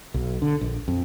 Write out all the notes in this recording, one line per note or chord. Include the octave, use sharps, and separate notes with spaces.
B1
D3
A#1
F2